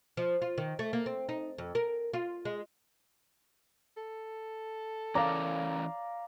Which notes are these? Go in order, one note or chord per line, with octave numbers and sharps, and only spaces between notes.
F3
F4
D#3
A3
A#3
C4
D#4
F2
A#4
F4
G#3
A4
E3 C#4 A#4 D5 F5 A#5